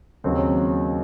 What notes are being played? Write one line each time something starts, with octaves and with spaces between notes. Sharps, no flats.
D#2 C#3 F#3 C4